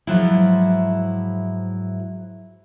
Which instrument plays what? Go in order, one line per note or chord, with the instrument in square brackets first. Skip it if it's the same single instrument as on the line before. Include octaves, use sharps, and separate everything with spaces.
[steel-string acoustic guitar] G#2 F3 F#3 E4